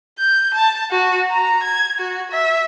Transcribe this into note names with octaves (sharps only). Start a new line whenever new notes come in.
G6
A5
F#4
A#5
G#6
F#4
E5